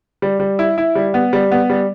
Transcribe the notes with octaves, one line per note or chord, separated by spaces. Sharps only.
G3
G3
E4
E4
G3
B3
G3
B3
G3